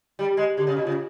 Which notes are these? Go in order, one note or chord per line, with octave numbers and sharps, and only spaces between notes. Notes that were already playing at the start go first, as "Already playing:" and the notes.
G3
G#3
D3 G4
C#3
B2
C#3 F4